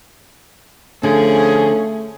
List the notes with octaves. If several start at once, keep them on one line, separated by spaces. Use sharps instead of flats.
D3 F3 A3 C#4 G#4